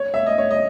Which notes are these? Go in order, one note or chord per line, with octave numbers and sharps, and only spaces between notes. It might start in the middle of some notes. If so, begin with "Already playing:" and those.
Already playing: C#5
E5
D#5
C#5
D#5